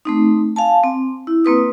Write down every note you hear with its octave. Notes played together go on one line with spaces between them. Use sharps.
A3 C4 D#4
F5 G#5 A5
C4
E4
A#3 C4 B4 D#6